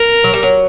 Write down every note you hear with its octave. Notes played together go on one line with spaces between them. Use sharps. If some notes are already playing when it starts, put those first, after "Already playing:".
Already playing: A#4
F#3
G3
F#3